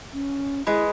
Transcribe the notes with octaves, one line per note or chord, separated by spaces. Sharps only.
C#4
G#3 E4 B4